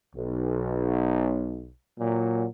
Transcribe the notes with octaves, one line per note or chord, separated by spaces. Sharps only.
B1
A#2 F#3